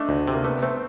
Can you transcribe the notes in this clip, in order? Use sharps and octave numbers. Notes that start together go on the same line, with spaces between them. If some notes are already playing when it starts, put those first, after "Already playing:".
Already playing: A3 D4 D#4
D2
C3
A#3
A3 B3
A3 C4